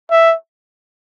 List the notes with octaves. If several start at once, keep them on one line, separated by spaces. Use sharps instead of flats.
E5